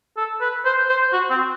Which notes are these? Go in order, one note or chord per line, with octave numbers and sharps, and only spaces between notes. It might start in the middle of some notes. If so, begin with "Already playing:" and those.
A4
B4
C5
C5
F#4
C4